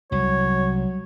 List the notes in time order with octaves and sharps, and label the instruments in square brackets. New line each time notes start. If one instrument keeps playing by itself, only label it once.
[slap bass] C2 [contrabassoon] F#3 [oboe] C#5